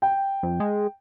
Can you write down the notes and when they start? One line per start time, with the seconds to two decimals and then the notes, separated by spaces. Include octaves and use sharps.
0.02 G5
0.43 F2
0.60 G#3